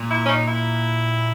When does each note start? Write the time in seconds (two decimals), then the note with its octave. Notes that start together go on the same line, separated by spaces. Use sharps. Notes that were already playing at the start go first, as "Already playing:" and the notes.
Already playing: A#2
0.11 E4
0.26 C#4
0.29 D#4
0.48 E4